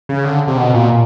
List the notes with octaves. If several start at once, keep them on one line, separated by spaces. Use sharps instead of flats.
C#3
D3
C3
B2
A#2